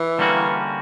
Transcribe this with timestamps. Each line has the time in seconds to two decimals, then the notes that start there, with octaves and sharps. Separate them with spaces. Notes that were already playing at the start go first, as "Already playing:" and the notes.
Already playing: E3
0.18 D3 G3 A#3 C#4 F#4